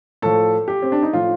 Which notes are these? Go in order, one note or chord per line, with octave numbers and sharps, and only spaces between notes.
A2 F3 A4
G4
C4
D4
D#4
A2 F3 F4